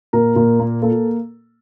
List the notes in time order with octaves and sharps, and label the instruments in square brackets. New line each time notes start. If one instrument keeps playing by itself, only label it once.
[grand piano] A#2 A#4
A#2
A#3
A#3 A4